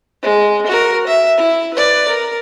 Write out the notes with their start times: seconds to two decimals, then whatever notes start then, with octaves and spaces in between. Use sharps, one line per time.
0.23 G#3
0.67 F#4 A#4
1.07 E5
1.37 E4
1.74 B4 D5
2.08 A#4